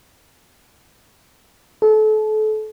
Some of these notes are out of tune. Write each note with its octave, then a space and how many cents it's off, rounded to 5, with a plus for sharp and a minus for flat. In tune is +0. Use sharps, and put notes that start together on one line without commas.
A4 -30